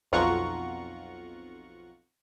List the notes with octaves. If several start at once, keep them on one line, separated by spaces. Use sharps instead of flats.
B1 F2 F4 F#5 A#5 C#6